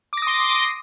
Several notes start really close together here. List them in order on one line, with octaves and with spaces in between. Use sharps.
D6 A#6 D#6 C6